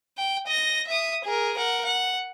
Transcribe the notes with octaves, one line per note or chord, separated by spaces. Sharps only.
G5
D#5 A#6
E5 D#6
G#4 A#4
A#4 F#5
F#5